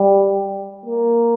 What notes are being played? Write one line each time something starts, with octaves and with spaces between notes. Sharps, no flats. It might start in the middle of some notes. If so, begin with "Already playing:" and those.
Already playing: G3
A#3